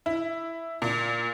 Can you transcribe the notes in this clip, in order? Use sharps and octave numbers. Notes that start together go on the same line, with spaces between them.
E4
A#2